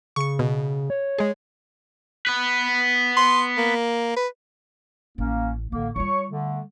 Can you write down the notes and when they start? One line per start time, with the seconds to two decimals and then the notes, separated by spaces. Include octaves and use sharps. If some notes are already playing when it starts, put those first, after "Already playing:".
0.16 C#3 C#6 C#7
0.39 B2
0.90 C#5
1.19 G#3 G#4
2.27 B3 B4
3.17 C6
3.58 A#3
4.17 B4
5.18 A1 A#3 C#4
5.72 A1 D3 A#3
5.96 G3 F4 C#5 C#6
6.30 D3 A3